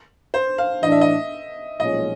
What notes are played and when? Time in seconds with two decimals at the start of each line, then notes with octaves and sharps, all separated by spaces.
0.34 C5
0.58 F5
0.83 A2 E3 A3 D4 D#5
0.92 E5
1.01 D#5
1.80 B1 A#2 F3 G#3 C#4 D#5